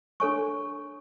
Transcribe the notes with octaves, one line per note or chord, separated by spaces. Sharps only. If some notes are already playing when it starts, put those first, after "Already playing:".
D4 A4 C#5 G#5 C#6